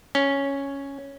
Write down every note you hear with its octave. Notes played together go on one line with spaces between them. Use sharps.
C#4